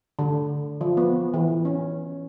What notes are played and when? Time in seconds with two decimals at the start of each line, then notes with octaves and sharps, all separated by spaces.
0.19 D3
0.81 F3
0.97 B3
1.34 E3
1.65 C#4